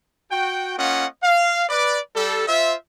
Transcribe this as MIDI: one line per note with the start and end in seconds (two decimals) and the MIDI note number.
0.31 0.74 66
0.31 0.74 79
0.78 1.05 58
0.78 1.05 61
0.78 1.05 65
0.78 1.05 75
0.78 1.05 78
1.23 1.64 77
1.69 1.98 71
1.69 1.98 74
2.15 2.45 55
2.15 2.45 69
2.48 2.74 65
2.48 2.74 72
2.48 2.74 76